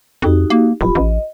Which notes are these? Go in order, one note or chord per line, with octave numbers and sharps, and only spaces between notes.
F2 D#4 F#4 G4
A#3
D1 F4 G4 B5
A1 D#5